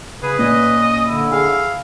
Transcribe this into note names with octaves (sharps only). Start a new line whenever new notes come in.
C#3 G#4 B4
A#2 C#4 D#5
D3 E4
G#4 F5